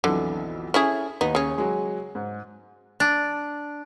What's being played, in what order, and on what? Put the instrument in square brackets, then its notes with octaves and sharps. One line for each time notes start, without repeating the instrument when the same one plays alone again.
[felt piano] B1 F2 E3 [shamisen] D3
[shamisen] C#4 E4 G#4 [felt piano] A4
[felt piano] D#2 [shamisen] B3 D#4
[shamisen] C#3 C#4
[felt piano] F#3 G#3
G#2
[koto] D4